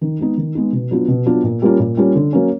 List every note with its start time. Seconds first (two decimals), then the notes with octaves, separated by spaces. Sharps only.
0.01 D#3
0.19 G#3 B3 D#4
0.37 D#3
0.55 G#3 B3 D#4
0.73 B2
0.91 F#3 B3 D4 F4
1.08 B2
1.26 F#3 B3 D4 F4
1.44 A#2
1.62 G3 A#3 C#4 F4
1.80 A#2
1.97 G3 A#3 C#4 F4
2.15 D3
2.33 F#3 A#3 C#4